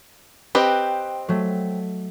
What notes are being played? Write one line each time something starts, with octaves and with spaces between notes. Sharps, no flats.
C4 G4 B4 D#5 G5
F#3 A3